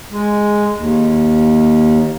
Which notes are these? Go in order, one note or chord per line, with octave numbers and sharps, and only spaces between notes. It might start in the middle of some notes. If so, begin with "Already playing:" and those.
G#3
D#2